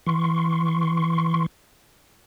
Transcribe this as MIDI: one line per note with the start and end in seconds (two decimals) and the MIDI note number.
0.07 1.46 52
0.07 1.46 84
0.07 1.46 85